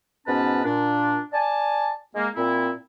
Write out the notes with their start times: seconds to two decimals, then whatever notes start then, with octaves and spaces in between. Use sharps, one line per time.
0.26 G#2 B2 B3 C#4 B4 A5
0.64 A#2 D4
1.33 D5 G#5 A5
2.14 G#3 A#3
2.36 A#2 C4 E4